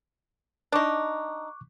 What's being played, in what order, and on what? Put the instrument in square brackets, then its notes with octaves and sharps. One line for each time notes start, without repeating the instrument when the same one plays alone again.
[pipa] D4 D#4 [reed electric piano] C#6 D6 F#6